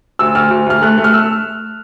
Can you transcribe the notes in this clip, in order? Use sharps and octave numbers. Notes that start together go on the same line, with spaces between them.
D2 E6
D2 F6
D2
D2 F6
A3 F#6
A3
F6
A3 E6